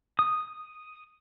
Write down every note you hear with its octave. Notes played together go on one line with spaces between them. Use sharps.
D#6